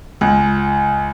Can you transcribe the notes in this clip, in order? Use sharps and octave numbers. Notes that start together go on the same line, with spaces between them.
C#2